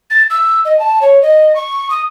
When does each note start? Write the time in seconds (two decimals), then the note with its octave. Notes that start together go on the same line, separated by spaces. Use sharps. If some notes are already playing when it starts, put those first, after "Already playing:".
0.10 A6
0.30 E6
0.65 D#5
0.79 A5
1.01 C#5
1.22 D#5
1.55 C#6
1.90 D#6